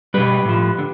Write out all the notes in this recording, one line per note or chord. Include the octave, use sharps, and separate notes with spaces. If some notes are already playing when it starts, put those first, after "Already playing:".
B2 G3 G4 B4
A2 F3
D3